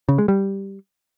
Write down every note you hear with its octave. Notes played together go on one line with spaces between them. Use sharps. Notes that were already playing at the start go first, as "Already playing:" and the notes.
C#3
G#3
G3